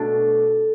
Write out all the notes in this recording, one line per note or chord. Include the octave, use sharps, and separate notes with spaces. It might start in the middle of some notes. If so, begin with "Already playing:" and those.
Already playing: B2 A3 D4 A4